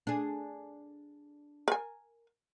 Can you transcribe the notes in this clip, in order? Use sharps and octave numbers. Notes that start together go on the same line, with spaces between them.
D4 G#4
A#4 G#5